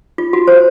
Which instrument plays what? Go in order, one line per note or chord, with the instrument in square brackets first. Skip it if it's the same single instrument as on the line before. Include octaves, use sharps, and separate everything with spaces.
[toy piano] F4
F#4
C5